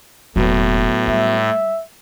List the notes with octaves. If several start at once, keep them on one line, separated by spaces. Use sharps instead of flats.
E1 A2 F#3 A#3 B3
G3 E5